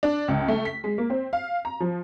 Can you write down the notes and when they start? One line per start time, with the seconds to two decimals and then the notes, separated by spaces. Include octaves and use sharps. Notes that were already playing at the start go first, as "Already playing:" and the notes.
0.03 D4
0.28 C#2
0.48 A3
0.65 B6
0.84 G#3
0.98 A#3
1.10 C4
1.33 F5
1.65 A#5
1.80 F3